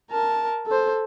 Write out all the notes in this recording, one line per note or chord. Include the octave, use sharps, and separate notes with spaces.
A#4 A5
A4 C5